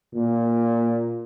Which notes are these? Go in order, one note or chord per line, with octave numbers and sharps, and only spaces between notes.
A#2